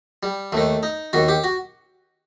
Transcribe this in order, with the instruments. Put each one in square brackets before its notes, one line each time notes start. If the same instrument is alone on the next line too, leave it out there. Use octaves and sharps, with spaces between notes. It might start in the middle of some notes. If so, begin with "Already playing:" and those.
[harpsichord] G3
D#2 D#3 A3
D#4
D#2 D#3 F#4
G4
F#4